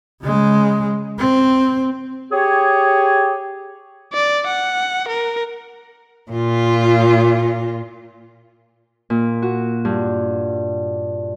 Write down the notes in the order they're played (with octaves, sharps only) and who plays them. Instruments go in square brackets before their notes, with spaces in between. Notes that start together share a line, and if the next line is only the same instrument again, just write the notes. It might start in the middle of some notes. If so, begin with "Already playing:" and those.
[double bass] C#3 G#3
C4
[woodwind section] G4 G#4 C#5
[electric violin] D5
F#5
A#4
[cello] A#2 F4
[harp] A#2
F#4
G2